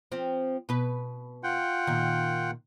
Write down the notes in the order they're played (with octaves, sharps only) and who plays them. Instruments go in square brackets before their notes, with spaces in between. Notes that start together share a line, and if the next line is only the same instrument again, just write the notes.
[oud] F3 C4
B2 B4
[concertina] F4 F#5 G5
[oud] A#2 D#3